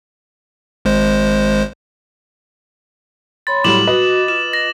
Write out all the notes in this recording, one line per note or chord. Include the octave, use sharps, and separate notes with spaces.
G#1 G#3 C5
C#5 B5 C6 A6
A2 F#3 G3 D6 E7 F#7
F#4 B4 D#5
F4 E7
A#6